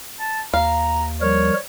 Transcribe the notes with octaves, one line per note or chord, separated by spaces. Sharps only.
A5
D#2 F5 A#5
F3 G3 A#4 C#5